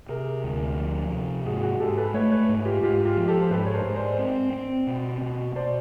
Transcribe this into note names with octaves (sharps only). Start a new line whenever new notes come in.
C3 G#4 A#4
D2
F3
C3
G#2 F#4 G#4
F#4 G#4
G#2 G4 A4
A4 B4
A3 B4 C#5
B4 C#5
G#2
F4 G4
G#2 F4 G4
F4 G4
F3
G4 A4
C5
G#2 A4 B4
C#5
A#4 C5
G#2
C5 D5
C4
C4
B2
B2
B2 C5 D5